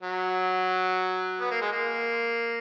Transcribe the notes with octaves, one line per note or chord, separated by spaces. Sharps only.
F#3
B3
A#3
G#3
A#3